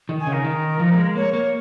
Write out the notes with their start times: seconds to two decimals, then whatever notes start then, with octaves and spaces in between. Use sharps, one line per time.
0.09 D#3
0.21 G#5
0.27 C#3
0.33 A#4
0.44 D#3
0.79 F3
0.94 A#3
0.97 G#3
1.15 A#3 C#5
1.33 A#3 C#5